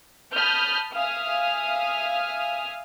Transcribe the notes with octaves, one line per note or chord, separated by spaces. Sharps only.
A5 B5 D#6 F6 G6
E5 F5 G#5 D#6 F6